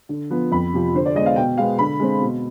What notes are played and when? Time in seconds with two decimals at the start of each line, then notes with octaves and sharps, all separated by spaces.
0.09 D3
0.30 F3 B3
0.51 F2 B5
0.73 C3 F3
0.94 D3 C5
1.06 D5
1.15 G#3 B3 D#5
1.26 F5
1.36 B2 G5
1.58 G#3 B3 F5
1.79 D3 B5
2.00 G#3 C4
2.21 B2